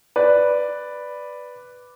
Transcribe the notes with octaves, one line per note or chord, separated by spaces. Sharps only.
B4 D5